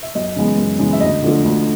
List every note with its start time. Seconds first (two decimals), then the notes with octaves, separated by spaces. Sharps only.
0.03 E5
0.15 F#2 D#5
0.36 C#3 E3 G#3 B3
0.58 F#2
0.79 C#3 E3 G#3 B3
0.93 E5
1.00 D2 D#5
1.22 D3 F3 A3
1.44 D2